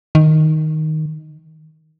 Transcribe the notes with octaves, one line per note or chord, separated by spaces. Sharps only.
D#3